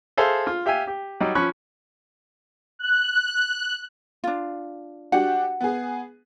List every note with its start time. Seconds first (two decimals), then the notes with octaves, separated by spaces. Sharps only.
0.17 G#4 A4 C5 E5 F5
0.47 F4
0.66 G4 E5 F5 G#5
0.87 G4
1.20 F#3 G3 D#4
1.35 F3 C#4 B5 C#6 F#6
2.79 F#6
4.24 D4 F4
5.12 D4 F#4 G4 F#5
5.61 B3 G#4